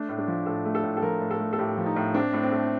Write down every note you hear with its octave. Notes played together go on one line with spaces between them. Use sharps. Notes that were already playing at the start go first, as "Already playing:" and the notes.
Already playing: A3 D4
A2
D4
F3
A2 A4
A3
A4
A2
A4
F3 A#4
A2
A4
A3
A4
A2 G4
F3
D#4
A2
C4 D4
A2
C4
A3